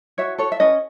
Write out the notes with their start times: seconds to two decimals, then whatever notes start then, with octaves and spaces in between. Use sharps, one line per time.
0.18 F#4 C#5 E5
0.38 A4 C#5
0.52 E5
0.60 C#4 B4 D#5